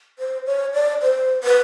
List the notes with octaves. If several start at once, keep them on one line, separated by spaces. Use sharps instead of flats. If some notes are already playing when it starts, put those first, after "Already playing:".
C5
C#5
D5
C5
B4